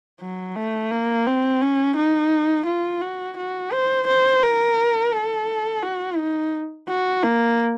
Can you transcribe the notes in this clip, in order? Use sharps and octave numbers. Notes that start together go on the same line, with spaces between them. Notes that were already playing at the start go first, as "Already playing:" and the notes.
F#3
A3
A#3
C4
C#4
D#4
F4
F#4
F#4
C5
C5
A#4
A4
F#4
D#4
F#4
A#3